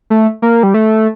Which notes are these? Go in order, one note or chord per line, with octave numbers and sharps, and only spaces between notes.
A3
A#3
G3
A3